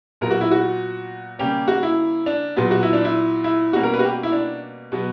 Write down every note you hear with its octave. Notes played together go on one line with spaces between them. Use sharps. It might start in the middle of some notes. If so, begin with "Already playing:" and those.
A#2 F#3 B3 A#4
F#4
E4
F#4
C#3 G3 A#3 C#4 G4
F#4
E4
D4
A#2 F#3 B3
F#4
E4
D4
E4
E4
B2 G3 A#3 C#4 F#4
A#4
B4
F#4
G4
E4
D4
B2 F#3 B3